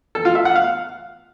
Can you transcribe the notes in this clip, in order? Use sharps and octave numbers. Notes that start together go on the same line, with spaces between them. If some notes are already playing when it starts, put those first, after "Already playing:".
A4
F4
E5
F#5
F5